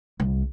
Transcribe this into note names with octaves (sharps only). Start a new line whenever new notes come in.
C2